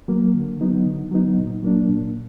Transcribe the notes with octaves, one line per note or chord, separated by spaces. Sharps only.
F#3 A#3
D3
F#3 B3 D#4
D3
F#3 B3 D#4
A#2
F#3 A#3 D4
A#2